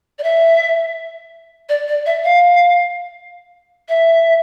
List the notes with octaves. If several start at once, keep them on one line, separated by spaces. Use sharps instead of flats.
D5
E5
D5
D5
E5
F5
E5